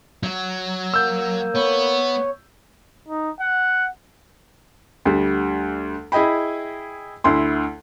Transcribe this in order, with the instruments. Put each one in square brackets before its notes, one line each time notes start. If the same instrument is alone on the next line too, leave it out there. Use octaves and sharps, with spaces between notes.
[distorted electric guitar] F#3
[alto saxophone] A#3 [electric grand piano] E6 G6
[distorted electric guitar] B3 [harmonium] C#5
[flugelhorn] D#4
F#5
[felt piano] D2 G3
E4 G#4 D#5 G5 B5
D2 E4 C6